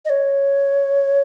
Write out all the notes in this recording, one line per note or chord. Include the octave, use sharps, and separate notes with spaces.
D#5
C#5